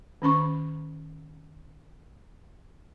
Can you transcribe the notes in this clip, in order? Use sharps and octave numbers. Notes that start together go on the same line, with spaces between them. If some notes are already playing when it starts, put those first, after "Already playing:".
D#3 C#4 B5 C#6